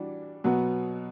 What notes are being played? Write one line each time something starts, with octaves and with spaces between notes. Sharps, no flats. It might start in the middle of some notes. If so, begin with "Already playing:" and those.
Already playing: E3 G3 D4 F#4
B2 F#3 B3 F#4